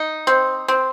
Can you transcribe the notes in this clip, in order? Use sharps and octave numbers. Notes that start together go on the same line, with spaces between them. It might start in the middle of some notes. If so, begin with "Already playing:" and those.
Already playing: D#4
C4
C4